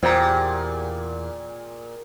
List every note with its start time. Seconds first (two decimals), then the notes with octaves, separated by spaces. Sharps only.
0.03 E2 A#2 G4 G#4 C5 A#5